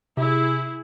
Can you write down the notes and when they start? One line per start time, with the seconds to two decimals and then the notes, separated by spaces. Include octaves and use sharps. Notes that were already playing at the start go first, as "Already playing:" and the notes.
0.17 C3 E4 G#4